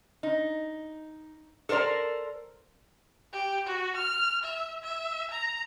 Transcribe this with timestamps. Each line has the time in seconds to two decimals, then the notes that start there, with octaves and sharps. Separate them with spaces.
0.23 D#4
1.69 A4 A#4 C5 D5 A#5
3.33 G4
3.66 F#4
3.96 F6
4.43 E5
4.83 E5
5.31 A#5